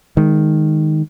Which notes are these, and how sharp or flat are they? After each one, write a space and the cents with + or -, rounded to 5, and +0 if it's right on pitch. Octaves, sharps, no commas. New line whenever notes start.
D#3 +0 G#3 +0